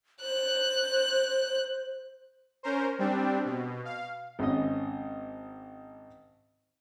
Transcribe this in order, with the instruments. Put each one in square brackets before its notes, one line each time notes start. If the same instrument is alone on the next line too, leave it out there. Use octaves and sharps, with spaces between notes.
[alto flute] C5 [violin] F#6
[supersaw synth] C#4 A#4 C5
G3 C4 D4
B2
F5
[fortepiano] G#1 C#4 D#5